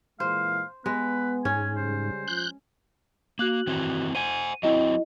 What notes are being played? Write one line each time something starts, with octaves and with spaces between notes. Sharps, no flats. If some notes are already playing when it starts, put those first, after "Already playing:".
A#2 E3 G#3 C5 F5
G#3 B3 B4
G#2 C#4 G#5
C#3 G3 C5
F3 F#6 G6
A#3 F#4 F#6 F#7
D#3 E3 C4
C5 F#5 G#5 D#7
F#3 C4 E4 D#5